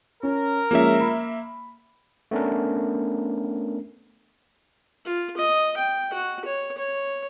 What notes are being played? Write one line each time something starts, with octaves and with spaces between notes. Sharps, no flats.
C#4 A#4
F3 G#3 A#3 C#4 E5
B5
A3 B3 C#4 D4 A#4
F4
D#5
G5
F#4
C#5
C#5